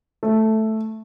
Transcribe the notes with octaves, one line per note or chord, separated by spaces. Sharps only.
A3